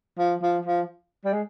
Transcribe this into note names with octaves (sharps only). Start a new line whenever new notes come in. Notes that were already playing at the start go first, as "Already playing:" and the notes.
F3
F3
F3
G3
G#3